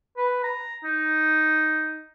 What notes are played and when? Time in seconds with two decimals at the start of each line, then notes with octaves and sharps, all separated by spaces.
0.17 B4
0.44 A#5
0.84 D#4